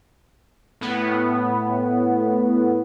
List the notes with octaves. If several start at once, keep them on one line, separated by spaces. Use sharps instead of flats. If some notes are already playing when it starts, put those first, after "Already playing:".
A2 B3